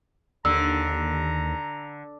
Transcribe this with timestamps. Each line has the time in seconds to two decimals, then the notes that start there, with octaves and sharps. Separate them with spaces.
0.45 D#2 D3 A#5 E6